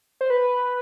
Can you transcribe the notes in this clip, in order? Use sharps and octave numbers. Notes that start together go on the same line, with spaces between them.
C5
B4